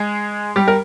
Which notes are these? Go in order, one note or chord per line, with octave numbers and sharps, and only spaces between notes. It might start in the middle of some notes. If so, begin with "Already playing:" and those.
Already playing: G#3 G#4
G3 G4
A#4